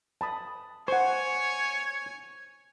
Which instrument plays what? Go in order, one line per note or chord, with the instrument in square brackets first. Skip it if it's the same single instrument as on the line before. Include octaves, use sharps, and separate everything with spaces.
[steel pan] A5 B5 D#6
[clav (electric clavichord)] C5 [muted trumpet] C#5 [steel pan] F#5 C#6 [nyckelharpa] G#5